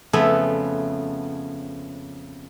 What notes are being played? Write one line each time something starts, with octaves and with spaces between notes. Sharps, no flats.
F2 C#3 A3 B3 B4 E5